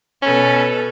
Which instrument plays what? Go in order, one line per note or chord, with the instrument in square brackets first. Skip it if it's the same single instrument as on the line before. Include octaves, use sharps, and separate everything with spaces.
[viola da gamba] B2 A4 B4 [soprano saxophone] C#4